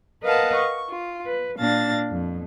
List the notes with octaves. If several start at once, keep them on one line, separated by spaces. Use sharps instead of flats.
A#4 B4 D#5 F5 F#5 A5
C#6
F4
B4
A#2 D4 F5 A6 A#6
F2